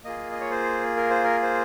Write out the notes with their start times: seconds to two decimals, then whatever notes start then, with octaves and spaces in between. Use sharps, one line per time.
0.04 A#3 F4 G#4 D#5
0.32 D#5
0.41 C#5
0.51 C5
0.96 A#4
1.10 C5
1.24 A#4
1.42 C5